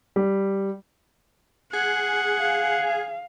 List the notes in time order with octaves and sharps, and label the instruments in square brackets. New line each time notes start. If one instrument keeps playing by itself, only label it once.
[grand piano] G3
[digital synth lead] G#4 [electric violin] F#5
[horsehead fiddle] F5